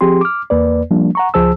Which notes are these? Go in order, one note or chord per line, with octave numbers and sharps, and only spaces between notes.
F3 C4 G4 G#4 C6
D6 F6
E2 A#3 B4 D5
F3 G3 A#3 D4
F#5 A#5 C#6
C#2 F3 G#4 C5 A5 E6